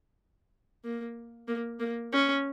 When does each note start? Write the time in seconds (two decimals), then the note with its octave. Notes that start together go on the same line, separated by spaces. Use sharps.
0.84 A#3
1.48 A#3
1.79 A#3
2.12 C#4